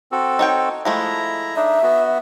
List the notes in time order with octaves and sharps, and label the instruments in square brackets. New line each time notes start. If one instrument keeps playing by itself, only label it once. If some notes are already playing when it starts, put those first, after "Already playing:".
[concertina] C4 F#4 A4
[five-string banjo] D#4 C#5 G5
[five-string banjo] F3 G#3 A3 [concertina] E4 A#5
[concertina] D4 D#4 [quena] E5
[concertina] B3 F#4